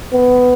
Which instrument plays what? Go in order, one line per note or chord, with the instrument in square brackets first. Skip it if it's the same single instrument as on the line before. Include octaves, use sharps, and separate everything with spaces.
[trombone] B3